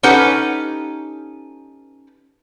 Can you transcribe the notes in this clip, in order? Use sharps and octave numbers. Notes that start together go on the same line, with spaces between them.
C#4 D#4 G4 A4 B4 F#5